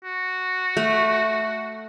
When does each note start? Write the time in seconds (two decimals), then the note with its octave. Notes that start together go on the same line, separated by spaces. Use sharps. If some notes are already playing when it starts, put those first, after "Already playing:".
0.04 F#4
0.77 A3